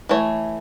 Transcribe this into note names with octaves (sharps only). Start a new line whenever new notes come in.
E3 A3 C#5